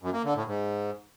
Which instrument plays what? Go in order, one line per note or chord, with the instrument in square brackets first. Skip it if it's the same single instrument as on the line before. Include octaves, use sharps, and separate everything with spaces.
[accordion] F#2
A#3
D3
A2
G#2